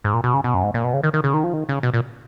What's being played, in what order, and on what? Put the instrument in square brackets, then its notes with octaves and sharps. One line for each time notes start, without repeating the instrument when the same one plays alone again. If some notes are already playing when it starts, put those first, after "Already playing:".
[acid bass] G#2
A#2
B2
C#3
B2
F#2
G#2
A#2
B2
C#3
D#3
D#3
C#3
D#3
F3
D#3
C#3
B2
A#2